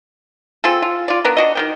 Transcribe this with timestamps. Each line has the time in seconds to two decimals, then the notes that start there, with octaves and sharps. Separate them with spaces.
0.64 C4 F4 G#4 A4
0.82 F4
1.08 F4 D5
1.25 B3 D4 A#4
1.37 D4 F#4 D#5
1.55 D#3 B3 G5